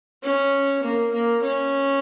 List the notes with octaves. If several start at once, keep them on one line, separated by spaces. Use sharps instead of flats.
C#4
A#3
A#3
C#4